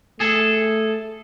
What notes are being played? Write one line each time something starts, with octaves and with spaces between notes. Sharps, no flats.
A3 G#4 A4